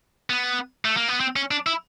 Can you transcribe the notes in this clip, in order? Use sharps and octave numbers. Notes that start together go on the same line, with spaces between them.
B3
A3
A#3
B3
C4
C#4
D4
E4